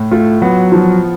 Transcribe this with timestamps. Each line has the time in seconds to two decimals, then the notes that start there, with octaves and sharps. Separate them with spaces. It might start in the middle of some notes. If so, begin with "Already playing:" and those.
Already playing: A2
0.11 A3 F4
0.42 F#3 B3
0.72 F3